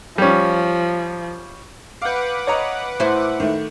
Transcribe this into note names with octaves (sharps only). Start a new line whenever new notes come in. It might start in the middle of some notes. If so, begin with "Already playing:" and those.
F3 G3 C#4
B4 F5 F#5 D6 G6
C#5 D#5 A#5
A2 E4 C5
D#3 A3